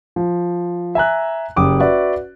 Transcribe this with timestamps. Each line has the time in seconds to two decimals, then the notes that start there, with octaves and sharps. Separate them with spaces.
0.16 F3
0.95 E5 G#5 A#5 F#6
1.56 F#1 G4 D6 D#6
1.80 F#4 B4 D5 E5